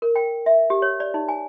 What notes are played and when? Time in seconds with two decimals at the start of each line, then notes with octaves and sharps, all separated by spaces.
0.02 A#4
0.16 G5
0.46 E5
0.70 G4
0.82 C#5
1.00 D5
1.14 D#4
1.28 G#5